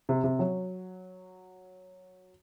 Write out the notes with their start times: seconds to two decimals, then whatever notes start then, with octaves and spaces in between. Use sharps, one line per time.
0.09 C3
0.24 C3
0.39 F#3